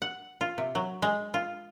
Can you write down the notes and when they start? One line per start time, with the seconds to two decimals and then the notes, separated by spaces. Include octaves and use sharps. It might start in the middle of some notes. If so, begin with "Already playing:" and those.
0.02 F#5
0.41 F4
0.58 C3
0.75 F#3
1.02 G#3
1.34 F4